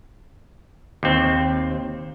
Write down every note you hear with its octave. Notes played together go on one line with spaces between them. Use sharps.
D#2 C4